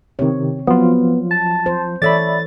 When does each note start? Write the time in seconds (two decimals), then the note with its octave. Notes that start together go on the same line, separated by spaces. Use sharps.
0.19 C3 D#3 C4 C#5
0.67 F3 F#3 B3 F4
1.31 A5
1.66 C5
2.02 E3 A4 C#5 D5 E5 B5 A6